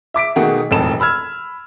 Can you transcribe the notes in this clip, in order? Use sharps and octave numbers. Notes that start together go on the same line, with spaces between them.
E5 D6 B6 D7
B2 D#3 A3 A#3 F#4 G#4
E1 F2 A2 D#3 A5 E7
B5 E6 F6 G#6